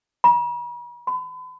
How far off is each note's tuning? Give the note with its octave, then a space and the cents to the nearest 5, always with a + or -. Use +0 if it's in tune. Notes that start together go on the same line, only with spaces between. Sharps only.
B5 -45
B5 +40